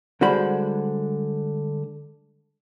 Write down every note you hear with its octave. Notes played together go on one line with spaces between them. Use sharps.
D3 G3 G#3 F#4 C5 B5